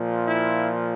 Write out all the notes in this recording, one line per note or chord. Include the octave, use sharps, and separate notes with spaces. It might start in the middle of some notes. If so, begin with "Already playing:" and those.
Already playing: A#2 F3
E4